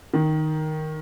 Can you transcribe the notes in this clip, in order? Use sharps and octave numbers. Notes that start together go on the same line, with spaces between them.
D#3